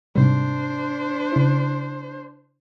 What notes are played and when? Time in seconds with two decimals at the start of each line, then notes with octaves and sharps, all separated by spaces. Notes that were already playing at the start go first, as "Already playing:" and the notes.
0.16 G#2 C3 G3 D4 C5
1.32 C#3 E4